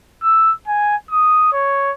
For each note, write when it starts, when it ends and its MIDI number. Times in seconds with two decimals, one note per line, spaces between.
0.23 0.52 88
0.67 0.96 80
1.10 1.49 87
1.53 1.92 73